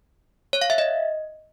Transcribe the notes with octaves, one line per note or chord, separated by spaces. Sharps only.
C#5
F5
E5
D#5